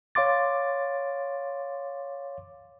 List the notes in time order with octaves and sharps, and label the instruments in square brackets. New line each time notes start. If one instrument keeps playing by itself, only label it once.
[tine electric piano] C#5 F5 C6 D6 A6